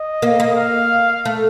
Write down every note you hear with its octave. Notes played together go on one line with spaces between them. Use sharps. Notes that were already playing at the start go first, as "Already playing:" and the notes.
Already playing: D#5
A#3
A#3
F5
A3